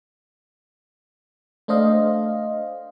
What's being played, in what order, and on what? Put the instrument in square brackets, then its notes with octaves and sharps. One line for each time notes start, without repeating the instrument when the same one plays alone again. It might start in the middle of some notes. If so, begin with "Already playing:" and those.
[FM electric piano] A3 D4 C5 D#5 F5